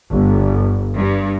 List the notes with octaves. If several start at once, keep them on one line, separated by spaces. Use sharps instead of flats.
G1
G2